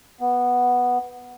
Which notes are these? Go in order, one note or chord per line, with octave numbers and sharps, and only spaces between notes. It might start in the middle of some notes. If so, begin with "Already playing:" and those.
B3